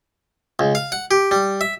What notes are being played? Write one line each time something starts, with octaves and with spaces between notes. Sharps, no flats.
C#2
F5
F#5
G4
G3
E5